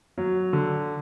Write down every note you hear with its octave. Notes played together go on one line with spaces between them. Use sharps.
F#3
D3